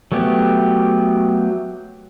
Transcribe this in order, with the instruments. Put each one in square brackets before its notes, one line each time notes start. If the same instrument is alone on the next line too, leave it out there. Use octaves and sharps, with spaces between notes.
[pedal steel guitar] F#3 A3 B3 G4